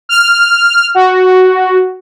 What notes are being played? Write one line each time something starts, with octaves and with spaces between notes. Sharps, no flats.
F6
F#4